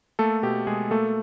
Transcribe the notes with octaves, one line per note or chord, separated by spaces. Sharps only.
A3 A#3 A4
B2 G4
B2 G#3 G#4
A3 A#3 A4